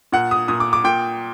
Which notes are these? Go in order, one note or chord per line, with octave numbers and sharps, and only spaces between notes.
A#2 F#5
D#6
A#2 D#6
D6
D6
A#2 G5